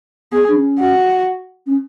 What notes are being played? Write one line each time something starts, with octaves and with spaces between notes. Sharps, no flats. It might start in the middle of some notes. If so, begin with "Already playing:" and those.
B3 G#4
D4
C#4
F#4
C#4